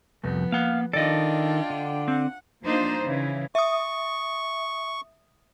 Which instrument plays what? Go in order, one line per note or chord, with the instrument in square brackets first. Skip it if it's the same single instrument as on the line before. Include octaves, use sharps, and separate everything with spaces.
[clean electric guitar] C2 F2 [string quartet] F3 B3
[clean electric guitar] A#3 F#5 [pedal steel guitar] F5
[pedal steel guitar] D#3 A4 [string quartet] D4 F4 G5 [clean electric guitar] D5 D#5
[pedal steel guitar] D3
[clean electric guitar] C4 [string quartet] F#5
[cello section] F3 A#3 D4 D#4 C5
C#3 E3
[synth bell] E5 D#6 [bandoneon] C#6